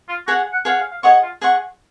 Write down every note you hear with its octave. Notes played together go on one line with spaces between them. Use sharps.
F4
F#4 G#4 C#5 F#5
F#5
G#4 C#5 F5 F#5
F5
F5
G#4 C#5 D#5 F#5 C#6
F4
G#4 D#5 F#5 C#6